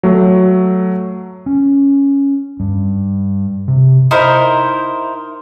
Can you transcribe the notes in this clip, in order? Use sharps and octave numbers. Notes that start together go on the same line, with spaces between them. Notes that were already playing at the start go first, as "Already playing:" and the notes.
F#3 A3
C#4
G2
C3
D#4 E4 A#4 C5